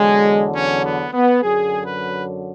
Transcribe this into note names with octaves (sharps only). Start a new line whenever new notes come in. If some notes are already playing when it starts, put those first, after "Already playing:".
Already playing: E2 D3 F#3 G#3
C#4
B3
B3
F#2 D3 F#3 G#4
B4